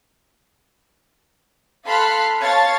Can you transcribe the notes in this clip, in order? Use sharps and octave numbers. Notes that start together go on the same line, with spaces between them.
A4 F5 B5 C6 F6 F#6
C#5 F5 A5 C#6 A6